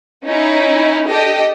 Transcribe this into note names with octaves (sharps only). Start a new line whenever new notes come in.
C#4 D#4 E4
D4 G4 A4 D#5